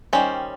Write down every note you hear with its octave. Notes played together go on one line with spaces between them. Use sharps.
D#3 G3 C#4 C5